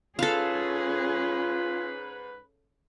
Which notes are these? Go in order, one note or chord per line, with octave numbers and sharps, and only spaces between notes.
G#2 C#4 F4 G#4 A4 B4 F5